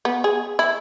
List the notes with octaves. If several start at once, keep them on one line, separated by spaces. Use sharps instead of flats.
B3
G#4
E4